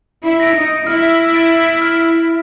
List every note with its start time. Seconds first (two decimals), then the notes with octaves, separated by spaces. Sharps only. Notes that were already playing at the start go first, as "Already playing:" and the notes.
0.24 E4
0.40 A#6 D7
0.55 D#4
0.87 E4 F6
1.34 A6 D7
1.82 F6